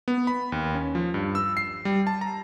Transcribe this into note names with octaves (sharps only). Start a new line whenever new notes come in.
B3
B5
D#2
C#4
F3
G2
E6
C7
G3
A5
A#5